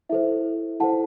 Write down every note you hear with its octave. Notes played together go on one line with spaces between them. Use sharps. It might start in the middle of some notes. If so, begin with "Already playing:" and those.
E4 A4 C5 E5
E4 A4 C5 F#5 A5